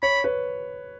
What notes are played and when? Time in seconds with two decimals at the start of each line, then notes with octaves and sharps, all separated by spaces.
0.02 C#5 B5
0.24 B4